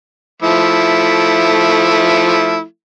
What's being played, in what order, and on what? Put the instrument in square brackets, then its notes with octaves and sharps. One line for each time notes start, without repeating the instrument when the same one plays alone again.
[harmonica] F3 A3 E4